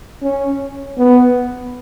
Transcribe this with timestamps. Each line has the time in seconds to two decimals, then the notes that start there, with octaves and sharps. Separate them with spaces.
0.22 C#4
0.98 B3